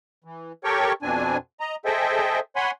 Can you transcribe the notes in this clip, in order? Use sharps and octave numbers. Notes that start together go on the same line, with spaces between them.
E3
G4 A4 A#4 C#5 G5 C#6
F2 B2 C4 D4 G#5
D#5 A#5
G#4 A4 C5 D#5 E5 G5
C#5 F#5 G#5 B5 C6